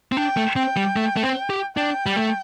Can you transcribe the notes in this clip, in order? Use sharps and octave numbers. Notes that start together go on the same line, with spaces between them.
C4
D4 G5
A3
C4 G5
G3
A3
A3
C4
G4
D4 G5
G3
A3